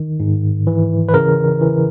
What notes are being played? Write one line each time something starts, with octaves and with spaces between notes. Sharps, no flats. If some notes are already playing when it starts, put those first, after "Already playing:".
Already playing: D#3
G#2
E3
B4
C#3 A#4
E3